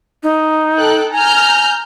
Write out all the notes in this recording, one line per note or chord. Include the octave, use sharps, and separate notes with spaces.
D#4
A4 G5 F#6
G#5 A#5 F6 G6